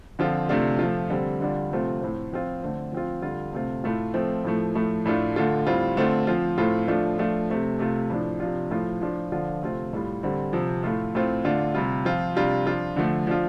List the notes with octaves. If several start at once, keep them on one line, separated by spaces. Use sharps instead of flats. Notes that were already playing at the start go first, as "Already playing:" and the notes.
D3 F3 C4 F4
C3 A3 D4 F4
F3 A3 F4
D3 G3 C4
D3 G3 D4 F4
C3 F3 A3 C4 F4
A2 A3 C4
F3 C4 F4
D3 A3 C4
F3 C4 F4
D3 G3 F4
C3 A3 C4 F4
A2 A3 F4
F3 A3 C4 F4
A2 F3 A3
A2 F3 A3
A2 A3 D4 F4
D3 A3 F4
A2 G3 C4 F4
D3 A3 C4 F4
F3 C4 F4
A2 A3 C4 F4
F3 A3 D4 F4
F3 A3 D4 F4
C3 A3 C4
C3 A3 F4
A2 F3 D4
C3 F3 D4 F4
A2 F3 A3 F4
A2 F3 D4 F4
D3 F3 D4 F4
C3 A3 C4 F4
A2 G3 F4
D3 G3 C4
C3 F3 C4
A2 A3 F4
A2 A3 C4 F4
D3 A3 D4 F4
C3 G3 F4
F3 C4 F4
C3 G3 D4 F4
F3 D4 F4
D3 F3 A3
F3 D4 F4